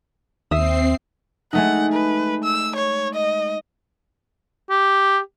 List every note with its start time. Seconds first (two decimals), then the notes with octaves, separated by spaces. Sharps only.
0.51 D#2 C4 E5 D#6 C7
1.53 G#3 A3 D#4 F#5
1.92 B4
2.44 E6
2.75 C#5
3.14 D#5
4.70 G4